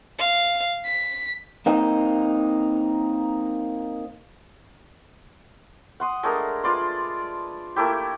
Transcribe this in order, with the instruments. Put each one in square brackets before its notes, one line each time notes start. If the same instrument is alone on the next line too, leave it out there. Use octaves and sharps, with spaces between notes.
[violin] F5
B6
[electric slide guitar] A#3 C4 D#4
[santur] F#5 C6 D#6
G#3 A3 D4 A#4
F4 B4 D5 C6
A3 A#3 E4 G4